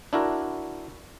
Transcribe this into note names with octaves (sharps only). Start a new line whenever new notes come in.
D4 E4 F#4 A#4